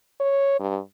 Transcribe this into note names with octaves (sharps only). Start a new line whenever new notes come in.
C#5
G2